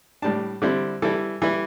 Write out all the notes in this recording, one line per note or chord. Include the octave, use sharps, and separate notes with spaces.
A2 G3 D4 A5
D3 G3 C4 E4
E3 G3 E4 A4
E3 G3 E4